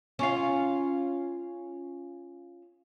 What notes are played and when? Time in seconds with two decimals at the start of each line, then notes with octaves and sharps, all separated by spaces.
0.19 C#4 F4 F5